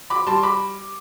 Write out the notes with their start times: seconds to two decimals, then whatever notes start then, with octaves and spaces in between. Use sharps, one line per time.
0.10 B5 D6
0.27 G3 A5 C6
0.43 B5 D6